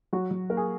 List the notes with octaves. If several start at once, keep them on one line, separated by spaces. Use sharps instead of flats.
F#3 F#4
F#3
A#3 A#4
G#4